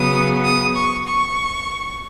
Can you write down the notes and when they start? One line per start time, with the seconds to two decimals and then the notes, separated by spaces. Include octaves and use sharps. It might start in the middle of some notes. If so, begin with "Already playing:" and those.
Already playing: C#3 F#3 B3 D#6
0.44 D#6
0.75 C#6
1.08 C#6